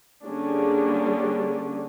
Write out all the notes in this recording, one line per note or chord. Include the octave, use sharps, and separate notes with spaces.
D3 G3 A#3 C#4 D4 G#4